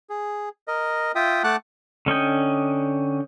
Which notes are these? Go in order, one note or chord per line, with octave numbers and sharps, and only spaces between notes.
G#4
A#4 D#5
F4 E5 G5 D#6
A3 F#5 A5 D6 F#6
D3 C#4 D#5 G5